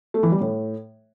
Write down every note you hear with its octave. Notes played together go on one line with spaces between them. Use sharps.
A3
E3
G3
A2